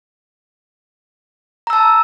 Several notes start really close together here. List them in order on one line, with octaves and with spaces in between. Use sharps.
A#5 E6 A5